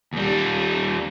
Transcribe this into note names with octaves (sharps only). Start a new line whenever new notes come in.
D#2 G3